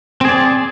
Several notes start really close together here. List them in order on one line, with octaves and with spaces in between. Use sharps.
C4 G#4 D5